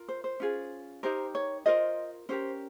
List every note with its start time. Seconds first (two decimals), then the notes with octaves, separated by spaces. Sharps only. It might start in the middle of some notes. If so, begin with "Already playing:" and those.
Already playing: F4 A#4
0.08 C5
0.24 C5
0.40 C#4 F4 G#4
1.03 D#4 G4 A#4 C5
1.35 C#5
1.66 F4 A#4 C5 D#5
2.29 C#4 G4 A#4 C5